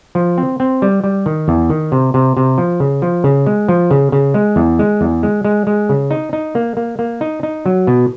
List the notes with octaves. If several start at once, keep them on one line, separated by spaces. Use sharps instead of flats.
F3
C4
C4
G3
G3
D#3
E2
D#3
C3
C3
C3
F3
C#3
F3
C#3
G#3
F3
C#3
C#3
G#3
E2
G#3
E2
G#3
G#3
G#3
C#3
D#4
D#4
A#3
A#3
A#3
D#4
D#4
F#3
B2